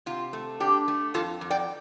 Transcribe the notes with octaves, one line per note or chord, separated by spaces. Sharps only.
C3 F4
A3
D4 G4
A3
F2 F4 A4
F2
D5 G5